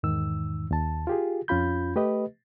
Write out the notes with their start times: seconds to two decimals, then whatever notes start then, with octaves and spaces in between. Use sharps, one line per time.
0.03 E2 G#2 D#3 E6
0.71 D#2 A5
1.07 F4 G4 G#4
1.48 F2 C#4 F4 B5 G6
1.96 A3 G4 B4 D#5